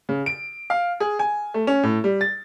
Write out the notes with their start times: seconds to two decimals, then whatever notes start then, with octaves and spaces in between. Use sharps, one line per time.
0.09 C#3
0.26 D7
0.70 F5
1.00 G#4
1.19 G#5
1.54 A3
1.67 C#4
1.83 A2
2.04 G3
2.21 A6